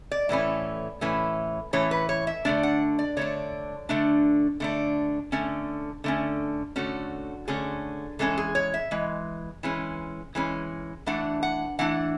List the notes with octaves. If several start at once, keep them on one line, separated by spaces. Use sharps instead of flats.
D5
A2 E3 A3 C#4
A2 E3 A3 C#4
A2 E3 A3 C#4 C#5
B4
C#5
E5
D3 A3 D4 D5
F#5
D5
D3 A3 D4 C#5
D3 A3 D4
D3 A3 D4
D3 A3 C#4
D3 A3 C#4
D3 A3 C#4 F#4
D3 A3 C#4 G#4
E3 G#3 C#4 A4
G#4
C#5
E5
E3 G#3
E3 G#3 C#4
E3 G#3 C#4
E3 A3 D4 F#5
F#5
E3 A3 D4 F#5